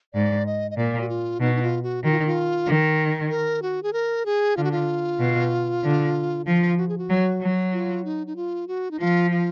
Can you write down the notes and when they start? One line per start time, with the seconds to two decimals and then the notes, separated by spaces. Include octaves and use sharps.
0.14 G#2 D5
0.46 D#5
0.71 D#5
0.77 A#2 D5
1.01 F#4
1.09 F4
1.40 B2 D#4
1.55 D#4
1.62 F4
1.83 F#4
2.04 D#3 F#4
2.11 F4
2.19 D#4
2.27 F4
2.67 D#3
3.30 A#4
3.62 F#4
3.83 G#4
3.93 A#4
4.26 G#4
4.57 D3 F4
4.64 F#4
4.72 F4
5.19 B2
5.84 D3
6.46 F3 F4
6.78 F#4
6.89 G#4
6.98 F#4
7.09 F#3
7.41 F#3
7.73 F4
8.05 D#4
8.27 D#4
8.36 F4
8.68 F#4
8.91 D#4
8.99 F3 F4
9.31 F4